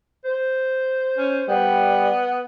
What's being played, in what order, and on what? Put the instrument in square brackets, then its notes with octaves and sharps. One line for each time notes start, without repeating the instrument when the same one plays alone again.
[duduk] C5
[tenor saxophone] C#4
[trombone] G3 [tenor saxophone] B3